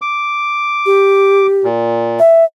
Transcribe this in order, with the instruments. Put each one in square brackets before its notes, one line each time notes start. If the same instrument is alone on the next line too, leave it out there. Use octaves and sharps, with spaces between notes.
[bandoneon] D6
[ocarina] G4
[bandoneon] A#2
[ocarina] E5